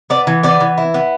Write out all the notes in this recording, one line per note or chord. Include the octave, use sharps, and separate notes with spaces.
B3 D5
E3
B3 D5
E3
E4
B3